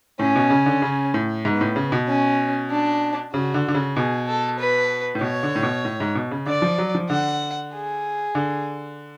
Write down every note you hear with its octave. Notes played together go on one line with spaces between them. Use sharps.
A2 C#4
B2
C#3
D3
C#3
A2
G#2 B3
A2
C#3
B2
C#4
D4
C#3 F#4
D3
D3
C#3
B2 G#4
A4
B4
A2
B2 C#5
D3
A2
B2
A2
G#2
B2
C#3
D3 D5
F3
F#3
F3
D3 F#5
G#4
D3